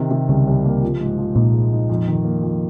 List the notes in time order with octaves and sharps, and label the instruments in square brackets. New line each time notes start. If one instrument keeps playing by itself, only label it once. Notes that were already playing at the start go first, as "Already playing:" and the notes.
Already playing: [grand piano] C3 D#3
C3
[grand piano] C2 [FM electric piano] C#3
[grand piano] C2
A#3
F3
G#2
F3
[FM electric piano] A#2 [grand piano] D#4
[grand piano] G#3
D#4
F2
D#3
A#3
F2